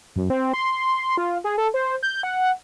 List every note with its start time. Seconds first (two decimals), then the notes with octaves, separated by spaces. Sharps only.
0.16 F#2
0.30 C4
0.53 C6
1.17 F4
1.44 G#4
1.58 A4
1.74 C5
2.03 G6
2.23 F#5